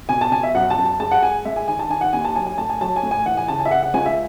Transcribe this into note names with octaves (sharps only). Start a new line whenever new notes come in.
B2 G#5
A5
B2 G#5
E5
F#2 F#5
A5
F#2
A5
G#3 A5
F#5
G#3 G#5
G#3 E5
G#5
D#3 G#5
A5
D#3 G#5
F#5
D#2 G#5
A5
F#3 G#5
G#5
A2 A5
G#5
F#3 A5
G#5
A2
G#5
E3 F#5
G#5
C#3 A5
G#5
E5
C#3 F#5
F#5
C#2 G#5
E5